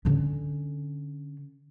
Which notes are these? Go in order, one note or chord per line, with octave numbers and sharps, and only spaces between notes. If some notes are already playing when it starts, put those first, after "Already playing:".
D3 C#4